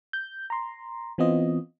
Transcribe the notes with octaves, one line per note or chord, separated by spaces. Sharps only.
G6
A#5 C6
E3 B3 C4 F4 D#5